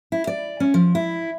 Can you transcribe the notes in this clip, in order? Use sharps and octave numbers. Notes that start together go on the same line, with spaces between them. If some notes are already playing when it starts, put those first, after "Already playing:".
E4
D5
C#4
F3
E4